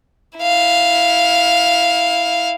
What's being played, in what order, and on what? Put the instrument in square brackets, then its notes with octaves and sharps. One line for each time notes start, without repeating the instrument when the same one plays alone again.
[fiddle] E4 F5